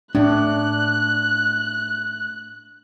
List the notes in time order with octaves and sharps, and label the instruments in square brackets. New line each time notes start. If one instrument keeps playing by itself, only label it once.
[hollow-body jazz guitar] A2 [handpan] D4 [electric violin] F#6